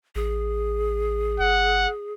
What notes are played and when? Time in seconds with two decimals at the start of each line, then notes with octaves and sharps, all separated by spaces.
0.15 A1 G#4
1.40 G1 F#5